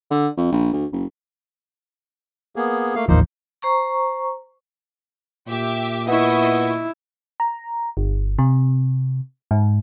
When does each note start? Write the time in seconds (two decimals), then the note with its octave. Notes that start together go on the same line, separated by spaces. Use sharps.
0.11 D3
0.37 F2
0.52 A#1
0.73 D2
0.92 F#1
2.56 A#3 B3 G#4
2.95 A3 A#3 F5
3.09 A1 D#2 F3 A#3 D#4 C5
3.62 C5 A#5 C#6
5.47 A#2 G4 E5 D6
6.08 B3 E4 D#5 E5 C#6
7.40 A#5
7.97 G1
8.39 C3
9.51 G#2